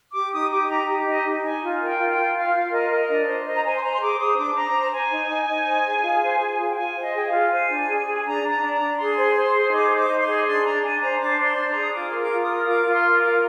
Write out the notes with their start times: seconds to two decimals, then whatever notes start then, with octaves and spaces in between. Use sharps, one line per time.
0.14 G4 D6
0.32 D#4 D#6
0.51 G4 D6
0.68 D#4 A#5
0.87 G4
1.06 D#4 D#5
1.24 D#4
1.42 D#4 G#5
1.62 F4
1.80 A#4
1.85 G5
1.99 F4
2.10 G5
2.17 F4
2.35 F4 F5
2.54 F4
2.71 A#4 D#5
2.91 A#4
3.08 D4 D#5
3.27 C5
3.45 C5 D#5
3.55 A#5
3.64 C5 G#5
3.76 C6
3.82 C5 A#5
3.94 C6
4.00 G#4 D6
4.19 C5 D#6
4.38 D4 D6
4.55 C5 A#5
4.74 C5
4.92 C5 G#5
5.12 D#4
5.30 D#4
5.49 D#4
5.67 C5
5.85 G#4
6.04 F4
6.22 C5
6.40 G#4
6.59 F4
6.70 G5
6.77 F4 G#5
6.95 C5
7.02 D#5
7.14 G#4 G5
7.26 F5
7.32 F4
7.51 C5 G#5
7.69 D4
7.88 G#4
8.07 G#4
8.25 D4 A#5
8.43 D4
8.49 A#5
8.61 D4
8.74 A#5
8.80 D4
8.98 G#4 C6
9.17 C5
9.35 C5
9.54 G#4
9.73 D#4 D6
9.90 C5
9.97 D6
10.09 D#4
10.21 C6
10.27 G#4
10.45 D4 C6
10.64 D4 A#5
10.82 D4 G#5
11.00 C5 A#5
11.19 D4 D6
11.38 C5
11.43 C6
11.56 D4
11.69 A#5
11.74 G#4
11.81 D#6
11.93 F4 D6
12.09 A#4 C6
12.18 D6
12.30 F4
12.42 D#6
12.49 A#4
12.66 F4 D6
12.85 F4
12.91 C6
13.03 A#4
13.16 D6
13.23 F4